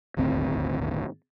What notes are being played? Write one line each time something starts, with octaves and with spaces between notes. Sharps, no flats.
D#1 G#1 D2 C4